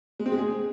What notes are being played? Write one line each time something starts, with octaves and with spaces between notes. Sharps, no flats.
G#3
C4
G#3
G#4